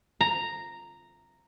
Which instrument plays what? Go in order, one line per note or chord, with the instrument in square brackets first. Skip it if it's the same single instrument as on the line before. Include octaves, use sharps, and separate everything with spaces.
[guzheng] A#5